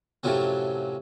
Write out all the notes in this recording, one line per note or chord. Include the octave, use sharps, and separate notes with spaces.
F#2 A2 C3 F3 F#3 C4